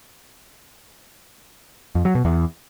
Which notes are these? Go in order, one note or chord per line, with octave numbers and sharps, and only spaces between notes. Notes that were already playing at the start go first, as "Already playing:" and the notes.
F2
F#3
B2
E2